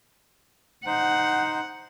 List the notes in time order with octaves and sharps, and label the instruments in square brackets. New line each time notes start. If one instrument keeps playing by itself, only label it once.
[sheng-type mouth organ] D#4 C5 [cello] F#5